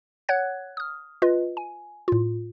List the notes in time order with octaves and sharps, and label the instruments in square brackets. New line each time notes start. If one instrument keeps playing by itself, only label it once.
[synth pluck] C#5 F#5 F#6 G#6
D#6 F6
F4 B4 D#5
G#5
A2 F4